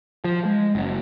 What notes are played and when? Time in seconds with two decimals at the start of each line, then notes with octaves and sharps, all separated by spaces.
0.24 F3
0.45 G#3
0.75 F#1